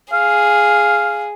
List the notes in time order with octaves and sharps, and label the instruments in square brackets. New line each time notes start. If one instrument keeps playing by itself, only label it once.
[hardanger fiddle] G#4 [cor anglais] F5